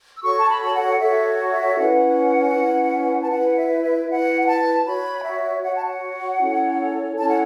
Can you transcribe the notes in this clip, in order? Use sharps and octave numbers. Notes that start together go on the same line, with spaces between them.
E6
F#4 A4 C#5 C#6
A5
B5
A5
F#5
F#4 A4 C#5 E5
E5
C#4 E4 B4 F#5
C#4 E4 B4
A5
E4 B4 F#5
E5
E5
E4 B4 F#5
F#5
A5
F#4 C#5 B5
E5
F#4 C#5 F#5
A5
F#5
C#4 E4 A4 C#5
C#4 E4 A4 C#5 A5
F#5